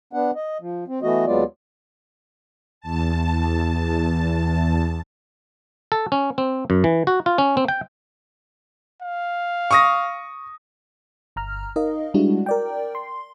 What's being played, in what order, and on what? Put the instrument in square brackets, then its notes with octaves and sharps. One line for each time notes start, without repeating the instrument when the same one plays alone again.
[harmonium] B3 D4 F#5
D#5
F3
C4
E3 A3 B3 F#4 D#5
D#2 F#3 G#3 B3 F4 D5
[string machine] E2 A5
[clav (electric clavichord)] A4
C#4
C4
F#2
E3
F#4
F4
C#4
C4
G5
[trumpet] F5
[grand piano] C#6 D#6 A#6
[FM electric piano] G1 A#5 F6
D#4 A#4 D#5 F5
G3 G#3 D4 E4 F#4
A#4 D5 G5
C6